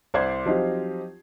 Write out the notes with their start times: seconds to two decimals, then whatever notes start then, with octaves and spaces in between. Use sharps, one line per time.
0.14 C2 C5 D5 C6 G#6 C7
0.46 F3 F#3 C4 D#4 F4 G4